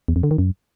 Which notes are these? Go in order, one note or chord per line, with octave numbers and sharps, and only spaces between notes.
E2
F2
D3
D#3
F#2